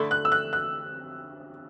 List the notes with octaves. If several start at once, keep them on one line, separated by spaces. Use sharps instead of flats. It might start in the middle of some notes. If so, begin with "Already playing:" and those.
Already playing: D3 A3 E4
F#6
E6
F#6
F#6